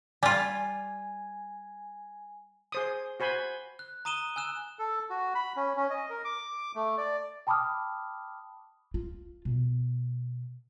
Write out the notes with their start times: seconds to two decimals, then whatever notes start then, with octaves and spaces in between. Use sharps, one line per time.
0.23 G3 F4 G#5
2.72 G#4 C5 D#6
3.20 F#4 C5 G#5 B5
3.79 F#6
4.05 A#5 D#6 D#7 E7 G7
4.36 G#5 E6 F#6 E7
4.79 A4
5.10 F#4
5.35 B5
5.56 C#4
5.77 C#4
5.90 D#5
6.10 A#4
6.25 D6
6.75 A3
6.98 D5
7.47 G5 A5 B5 D6 D#6 F6
8.94 F4
9.45 B2